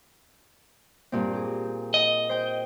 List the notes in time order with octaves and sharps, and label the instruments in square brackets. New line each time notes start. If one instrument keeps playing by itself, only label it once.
[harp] G2 A#2 C4
G4 G#4
[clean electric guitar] D#5
[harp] C5 G5